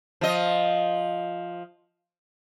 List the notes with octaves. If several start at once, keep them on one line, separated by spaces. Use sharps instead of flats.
F3 D#5